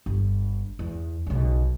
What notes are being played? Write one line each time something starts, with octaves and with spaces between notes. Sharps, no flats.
G1
E2
B1 C#3